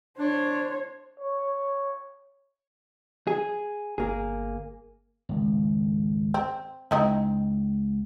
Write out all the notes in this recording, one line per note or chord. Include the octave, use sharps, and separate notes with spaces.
D4 C5 C#5
C#5
G#4
G1 A#3 G#4
G#1 C#2
C4
C#2 C4 D#4 E4